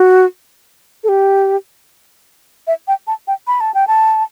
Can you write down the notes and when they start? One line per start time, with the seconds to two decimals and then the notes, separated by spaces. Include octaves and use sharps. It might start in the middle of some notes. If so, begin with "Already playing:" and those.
Already playing: F#4
1.04 A4
1.09 G4
2.67 E5
2.88 G5
3.07 A5
3.27 G5
3.47 B5
3.60 A5
3.74 G5
3.87 A5